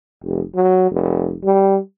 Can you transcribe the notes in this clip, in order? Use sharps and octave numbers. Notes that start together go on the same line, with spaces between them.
F1
F#3
F1
G3